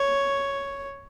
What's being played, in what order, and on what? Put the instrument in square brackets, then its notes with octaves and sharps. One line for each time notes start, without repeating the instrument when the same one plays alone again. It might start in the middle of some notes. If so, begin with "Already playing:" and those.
Already playing: [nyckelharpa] C#5